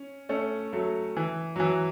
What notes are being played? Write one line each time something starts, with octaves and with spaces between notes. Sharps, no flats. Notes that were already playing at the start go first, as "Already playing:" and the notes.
Already playing: C#4
A3 C#4
F#3 A3
E3
F#3
E3